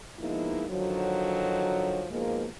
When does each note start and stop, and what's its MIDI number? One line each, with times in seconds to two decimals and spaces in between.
0.19 0.64 53
0.19 0.64 56
0.19 0.64 58
0.19 0.64 59
0.19 0.64 63
0.19 0.64 64
0.69 2.05 50
0.69 2.05 51
0.69 2.05 53
0.69 2.05 54
2.10 2.46 44
2.10 2.46 47
2.10 2.46 53
2.10 2.46 56
2.10 2.46 58